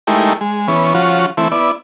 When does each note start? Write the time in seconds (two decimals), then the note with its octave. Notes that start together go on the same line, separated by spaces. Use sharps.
0.07 G#3 A3 D#4 E4 G4 A#4
0.41 G#3
0.68 E3 B3 C#4
0.94 F3 C#4 F4 F#4
1.37 E3 A3 C4 E4
1.51 B3 E4 D5